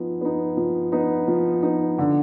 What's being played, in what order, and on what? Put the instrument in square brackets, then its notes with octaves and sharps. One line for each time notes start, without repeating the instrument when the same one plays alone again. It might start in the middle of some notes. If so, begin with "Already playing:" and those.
Already playing: [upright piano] F3 B3 D#4
B3 D#4
F3
B3 D#4
F3
B3 D#4
D3